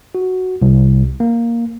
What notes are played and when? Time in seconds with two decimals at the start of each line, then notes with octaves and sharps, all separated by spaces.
0.15 F#4
0.62 C2
1.20 A#3